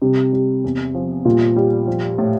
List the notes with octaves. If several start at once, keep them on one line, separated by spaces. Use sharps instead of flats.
C3 G3
G3
E2
F3
A#2 G3
G3
F3
A2